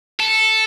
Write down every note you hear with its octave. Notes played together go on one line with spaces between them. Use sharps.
A4